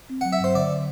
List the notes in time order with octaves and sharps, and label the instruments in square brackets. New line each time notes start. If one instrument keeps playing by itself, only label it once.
[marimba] C4
[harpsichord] F#5
[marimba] F#3
[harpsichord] E5
[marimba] G2 [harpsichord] C5
[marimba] D3 [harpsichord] D5